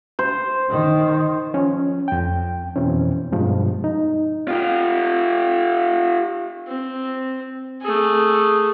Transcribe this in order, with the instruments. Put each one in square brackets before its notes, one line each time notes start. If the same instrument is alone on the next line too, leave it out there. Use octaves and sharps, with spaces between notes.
[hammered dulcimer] C5
[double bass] D#3
[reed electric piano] F3 C#4
F2 G5
F2 B2 E3 C4 C#4
G2 B2 F3 G#3
D#4
[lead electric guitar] F4 G4
[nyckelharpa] C4
A3 G#4